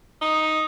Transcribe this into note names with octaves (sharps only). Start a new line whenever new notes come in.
D#4